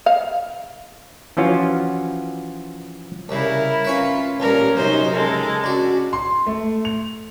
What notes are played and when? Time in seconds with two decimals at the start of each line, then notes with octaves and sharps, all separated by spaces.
0.06 F5
1.37 E3 F3 C#4 F4 F#4
3.29 C2 C#3 E4 A#4
3.85 C#4 F4 B4 C#5 G#5
4.40 A1 A#2 G3 C#4 A#4
4.77 F#2 C3 F#3 C#4 D#4 C5
5.13 C#3 G#3 A4 A#4
5.64 C#4 D4 F#4 D5
6.13 C6
6.46 A3
6.85 F7